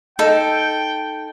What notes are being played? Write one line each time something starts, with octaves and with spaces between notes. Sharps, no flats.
D#4 A4 G5